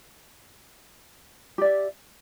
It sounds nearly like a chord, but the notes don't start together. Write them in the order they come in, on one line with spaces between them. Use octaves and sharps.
G4 D5 E5